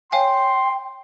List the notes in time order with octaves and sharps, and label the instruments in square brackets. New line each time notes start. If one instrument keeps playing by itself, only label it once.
[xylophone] C#5 F5 G#5 [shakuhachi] G5 [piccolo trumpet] C6